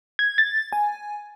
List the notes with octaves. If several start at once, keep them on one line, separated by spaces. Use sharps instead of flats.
G#6
A6
G#5